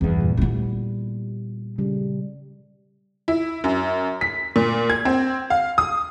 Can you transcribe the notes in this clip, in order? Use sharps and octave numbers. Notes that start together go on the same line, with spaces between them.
E2 G2
A#2
G3 B3 E4
C#3 G3
E4
F#2
B6
A#2
G#6
C4
F5
D#6